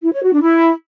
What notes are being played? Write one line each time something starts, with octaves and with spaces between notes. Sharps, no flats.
E4
C#5
F#4
D4
E4